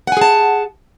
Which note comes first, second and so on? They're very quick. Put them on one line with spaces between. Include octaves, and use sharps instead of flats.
F#5 G#5 G#4 A5